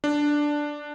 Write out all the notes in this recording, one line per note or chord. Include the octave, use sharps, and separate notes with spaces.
D4